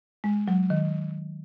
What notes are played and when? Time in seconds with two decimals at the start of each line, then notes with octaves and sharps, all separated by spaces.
0.24 G#3
0.48 F#3
0.70 D#3